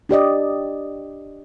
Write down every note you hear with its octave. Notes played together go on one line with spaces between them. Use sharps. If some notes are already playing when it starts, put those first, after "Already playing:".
D4 G4 D5 D#5